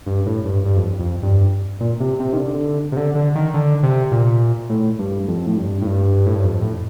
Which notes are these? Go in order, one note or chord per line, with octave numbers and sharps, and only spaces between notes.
G2
A2
G2
G2
F2
F2
G2
A#2
C3
C3
D#3
D3
C3
D3
D3
D#3
D3
C3
A#2
A2
G2
F2
A2
G2
A2
G2
A2
G2
F2
A2